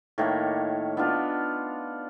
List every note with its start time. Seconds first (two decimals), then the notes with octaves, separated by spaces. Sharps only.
0.18 A2 D#3 A#3 C#5
0.97 B3 D4 F4 F#5